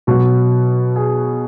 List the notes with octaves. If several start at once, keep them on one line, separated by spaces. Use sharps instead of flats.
B2 F#3 F#4
G#4